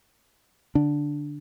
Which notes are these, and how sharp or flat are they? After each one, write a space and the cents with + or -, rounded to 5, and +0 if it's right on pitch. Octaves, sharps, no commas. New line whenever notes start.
D3 +0 D4 +0